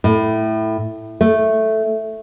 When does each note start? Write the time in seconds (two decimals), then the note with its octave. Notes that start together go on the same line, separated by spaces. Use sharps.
0.04 A2
1.21 A3